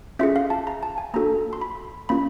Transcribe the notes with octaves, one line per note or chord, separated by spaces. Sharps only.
C#4 F4 G#4 E5
F5
A5
A#5
A5
G#5
A#3 D4 F#4 A4 A#5
C6
B5
A#3 C#4 F4 B5